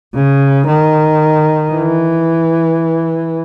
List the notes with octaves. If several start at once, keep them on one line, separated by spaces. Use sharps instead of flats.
C#3
D#3
E3